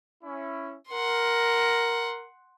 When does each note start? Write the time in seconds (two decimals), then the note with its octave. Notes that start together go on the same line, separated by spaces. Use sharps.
0.24 C#4 E4
0.90 A#4 F#5 C6